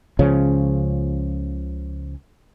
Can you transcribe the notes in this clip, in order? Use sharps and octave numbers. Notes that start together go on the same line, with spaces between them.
C#2 C#3 F3 C#4